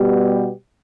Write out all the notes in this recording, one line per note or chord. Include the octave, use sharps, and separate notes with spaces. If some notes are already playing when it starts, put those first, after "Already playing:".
Already playing: B2 G3 B3 G4